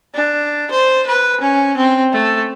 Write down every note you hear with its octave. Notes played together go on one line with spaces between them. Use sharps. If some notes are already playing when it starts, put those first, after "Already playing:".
D4
C5
B4
C#4
C4
A3